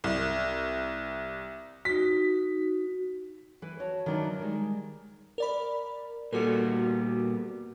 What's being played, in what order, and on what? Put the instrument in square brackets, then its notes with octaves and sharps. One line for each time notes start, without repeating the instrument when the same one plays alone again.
[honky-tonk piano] C2
[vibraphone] D#4 F#4 [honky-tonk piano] B6
[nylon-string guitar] E3 B4
F#4 C#5 A5
D#3 E3 F#3 D4
D#3 G3 G#3
[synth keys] A#4 D5 B5
[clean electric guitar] A#2 G3 B3 [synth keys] F#4 A4 A#4